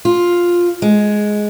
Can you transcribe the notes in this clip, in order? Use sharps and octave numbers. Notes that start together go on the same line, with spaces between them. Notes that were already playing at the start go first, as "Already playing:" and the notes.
F4
G#3